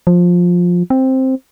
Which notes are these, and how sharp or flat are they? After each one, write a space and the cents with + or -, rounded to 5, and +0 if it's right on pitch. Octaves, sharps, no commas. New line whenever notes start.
F3 +15
C4 +5